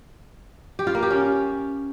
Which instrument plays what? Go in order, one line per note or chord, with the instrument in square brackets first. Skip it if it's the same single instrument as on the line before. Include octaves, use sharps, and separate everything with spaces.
[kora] G4
F4
A#3
G4
C#4